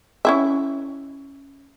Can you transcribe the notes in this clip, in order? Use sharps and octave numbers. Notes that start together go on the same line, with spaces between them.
C#4 E4 E5